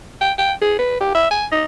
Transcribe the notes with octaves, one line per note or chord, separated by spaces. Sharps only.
G5
G5
G#4
B4
G4
E5
G#5
D#4